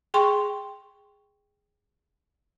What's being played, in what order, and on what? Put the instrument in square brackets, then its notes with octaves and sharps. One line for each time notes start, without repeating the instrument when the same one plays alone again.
[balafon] G#4 G5 C6 C#6